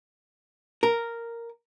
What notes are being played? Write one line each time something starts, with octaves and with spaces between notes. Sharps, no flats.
A#4